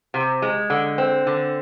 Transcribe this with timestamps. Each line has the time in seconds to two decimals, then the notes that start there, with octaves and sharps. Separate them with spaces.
0.14 C3
0.42 G#3
0.70 D3
0.98 C4
1.27 D3